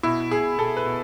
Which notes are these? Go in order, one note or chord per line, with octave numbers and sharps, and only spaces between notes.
B2 E4
B2 G#4
B2 A4
B4
B2